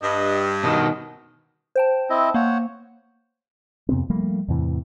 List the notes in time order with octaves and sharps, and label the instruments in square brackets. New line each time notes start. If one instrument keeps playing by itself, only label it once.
[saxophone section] G2 [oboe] D#5
[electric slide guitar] B2 D#3 [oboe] D#5
[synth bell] C5 G5 A5
[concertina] C4 E4 D#5
[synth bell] A#3 [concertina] C5 C#5 F#5
[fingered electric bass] F2 C3 B3 C4
F3 G3 A3 A#3
E2 A2 C3 E3